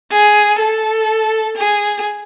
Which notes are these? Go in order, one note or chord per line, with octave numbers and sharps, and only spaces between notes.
G#4
A4
G#4